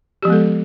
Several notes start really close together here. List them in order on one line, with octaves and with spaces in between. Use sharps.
G4 F3 B3 G#3 A4